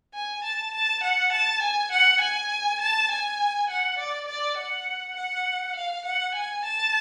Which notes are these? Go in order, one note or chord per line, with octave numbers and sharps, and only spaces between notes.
G#5
A5
A5
F#5
A5
G#5
F#5
G#5
A5
G#5
F#5
D5
D5
F#5
F#5
F5
F#5
G#5
A5